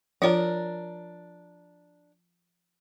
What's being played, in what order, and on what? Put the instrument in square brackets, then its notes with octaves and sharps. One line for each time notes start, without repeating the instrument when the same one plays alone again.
[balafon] F3 F4 C#5 [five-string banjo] D4 A#4